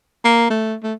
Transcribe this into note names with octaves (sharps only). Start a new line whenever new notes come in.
A#3
A3
A3